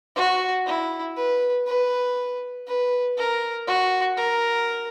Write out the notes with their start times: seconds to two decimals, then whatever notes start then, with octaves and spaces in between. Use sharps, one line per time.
0.16 F#4
0.66 E4
1.17 B4
1.67 B4
2.67 B4
3.17 A#4
3.67 F#4
4.17 A#4